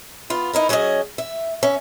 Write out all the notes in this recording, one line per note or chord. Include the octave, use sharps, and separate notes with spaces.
B3 F4
D#4 E4 A#4
F#3 C#4 G#4 C#5 D#5
E5
C#4 E5